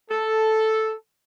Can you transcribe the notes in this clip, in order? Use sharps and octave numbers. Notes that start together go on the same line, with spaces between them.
A4